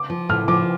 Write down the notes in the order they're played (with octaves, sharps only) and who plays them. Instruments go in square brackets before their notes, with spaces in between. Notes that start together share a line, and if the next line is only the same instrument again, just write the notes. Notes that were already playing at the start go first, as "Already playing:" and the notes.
Already playing: [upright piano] D6
[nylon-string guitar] F3
[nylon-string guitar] A2 [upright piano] F6
[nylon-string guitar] F3 [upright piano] D6